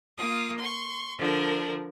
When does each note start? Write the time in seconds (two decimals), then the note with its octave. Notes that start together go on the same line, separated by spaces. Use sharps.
0.17 A#3 F4 D#6
0.58 C6 C#6
1.17 D3 F3 D4 A#4